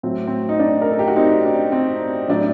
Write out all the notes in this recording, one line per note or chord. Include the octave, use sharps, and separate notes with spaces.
A2 F#3 C4
C4
D#4
D4
A#4
A4
G4
F#4
C4 D#4
D4
C4
A2 F#3 D4